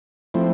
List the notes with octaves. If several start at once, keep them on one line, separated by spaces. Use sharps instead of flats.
F3 A3 C4 E4